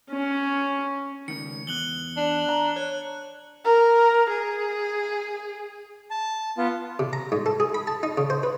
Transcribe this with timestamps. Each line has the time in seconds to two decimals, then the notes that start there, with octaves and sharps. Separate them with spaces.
0.10 C#4
1.28 C#2 D#3 C#7
1.67 E2 F#6 F#7 G7
2.17 D4
2.49 A#5
2.76 C#5 F#6
3.65 A#4
4.30 G#4
6.11 A5
6.57 B3 F4
6.99 C3
7.13 A#5
7.32 G#2
7.46 A4
7.60 G#4
7.74 B5
7.87 A5
8.03 D#4
8.18 C#3
8.30 C5
8.43 B4